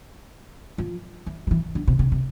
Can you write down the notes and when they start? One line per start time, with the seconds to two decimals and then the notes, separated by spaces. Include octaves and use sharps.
0.78 F3
1.26 E3
1.47 F3
1.51 E3
1.75 D3
1.88 C3
1.99 C#3
2.12 C3